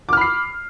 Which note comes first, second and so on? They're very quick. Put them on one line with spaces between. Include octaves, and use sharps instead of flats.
D6 F6 B5 C7